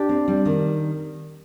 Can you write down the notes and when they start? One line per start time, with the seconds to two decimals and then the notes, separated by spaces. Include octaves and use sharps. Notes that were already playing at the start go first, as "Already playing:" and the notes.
Already playing: D4 G4 D5
0.09 C4
0.28 G3
0.46 D#3